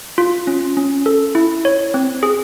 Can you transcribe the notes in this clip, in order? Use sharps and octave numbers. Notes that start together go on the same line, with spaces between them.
F4
C#4
C#4
A4
E4
C#5
C4
G#4